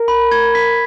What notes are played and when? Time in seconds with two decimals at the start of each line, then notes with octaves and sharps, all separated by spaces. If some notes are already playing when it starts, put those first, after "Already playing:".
Already playing: A#4
0.08 B5
0.32 G#6
0.55 B6